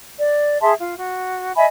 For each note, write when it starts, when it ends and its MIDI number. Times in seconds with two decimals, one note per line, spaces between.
0.18 0.60 74
0.60 0.72 68
0.60 0.72 76
0.60 0.72 81
0.60 0.72 84
0.78 0.93 65
0.96 1.51 66
1.56 1.65 75
1.56 1.65 76
1.56 1.65 80
1.56 1.65 83